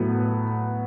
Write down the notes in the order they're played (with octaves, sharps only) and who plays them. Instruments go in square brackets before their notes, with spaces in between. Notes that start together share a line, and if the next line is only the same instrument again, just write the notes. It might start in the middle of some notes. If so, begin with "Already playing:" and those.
Already playing: [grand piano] A2 F#3 B3